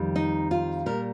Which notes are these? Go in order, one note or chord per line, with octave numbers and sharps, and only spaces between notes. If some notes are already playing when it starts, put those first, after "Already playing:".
Already playing: F2 D#3 G3
D#4
F4
A#2 G3 A#4